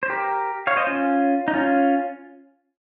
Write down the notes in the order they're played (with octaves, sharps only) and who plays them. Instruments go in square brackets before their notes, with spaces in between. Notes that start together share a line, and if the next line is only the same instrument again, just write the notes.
[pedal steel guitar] C5
G4 A#4
C#5 F5
C5 D#5
C#4 F4
D#4
C#4 F4